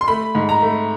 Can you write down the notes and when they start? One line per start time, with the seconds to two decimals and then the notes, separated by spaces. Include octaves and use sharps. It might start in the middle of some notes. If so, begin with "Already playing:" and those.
0.01 C6
0.08 A3 B5
0.35 G#2
0.49 A#5
0.62 A3